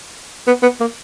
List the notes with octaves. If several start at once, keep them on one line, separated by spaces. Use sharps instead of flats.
B3
B3
A#3